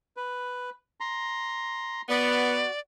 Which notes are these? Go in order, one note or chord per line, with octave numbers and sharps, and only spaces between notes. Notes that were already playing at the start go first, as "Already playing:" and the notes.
B4
A#5 C6
B3 F#4 D5